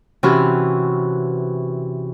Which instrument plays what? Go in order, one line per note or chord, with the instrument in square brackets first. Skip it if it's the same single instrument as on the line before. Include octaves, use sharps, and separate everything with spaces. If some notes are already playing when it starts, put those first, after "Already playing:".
[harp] C3 E3 C#4 F#4 B4 F6